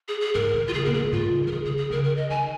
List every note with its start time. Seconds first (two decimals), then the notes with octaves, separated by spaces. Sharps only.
0.08 G#4
0.21 G#4
0.34 G#2 A#4
0.54 D#3
0.68 F4
0.73 C#3 G#4
0.85 A#2 A#4
0.94 G#4
1.00 G#2
1.12 G#2 F4
1.26 C#3
1.44 F3
1.47 A#4
1.51 D#3 G#4
1.65 C#3 G#4
1.78 G#4
1.90 C#3 A#4
2.04 A#4
2.17 D#5
2.30 D#3 G#5